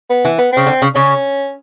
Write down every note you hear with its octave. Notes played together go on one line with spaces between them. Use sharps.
B3
E3
B3
C#3 C4
D3
C#3
C#3 C#4